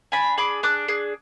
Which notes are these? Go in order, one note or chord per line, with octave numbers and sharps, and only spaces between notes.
D4 G#5 B5
G#4 B5 D6
D4 D6 F#6
G#4